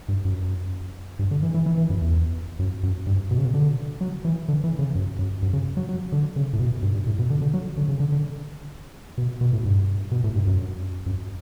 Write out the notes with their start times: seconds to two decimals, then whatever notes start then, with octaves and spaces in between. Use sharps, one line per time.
0.08 G2
0.25 F#2
1.19 G2
1.31 D3
1.43 E3
1.54 E3
1.66 E3
1.78 E3
1.90 F#2
2.02 E2
2.59 F#2
2.83 F#2
3.06 G2
3.31 B2
3.38 C#3
3.45 B2
3.54 D3
4.01 F#3
4.25 E3
4.48 D3
4.64 E3
4.79 C#3
4.95 F#2
5.19 F#2
5.42 F#2
5.53 C#3
5.77 F#3
5.89 F#3
6.12 D3
6.36 C#3
6.53 A2
6.59 B2
6.83 G2
6.94 G2
7.07 A2
7.19 B2
7.30 D3
7.41 D3
7.54 F#3
7.77 D3
7.89 C#3
8.00 D3
8.12 D3
9.18 B2
9.41 B2
9.53 A2
9.65 G2
10.11 B2
10.24 A2
10.36 G2
10.47 F#2
11.06 F#2